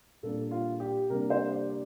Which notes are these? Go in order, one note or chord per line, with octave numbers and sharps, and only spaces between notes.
A#2 G3 A#3 D4 A4
F4
G4
C3 G3 A#3 D4 A#4
C5
D5
D5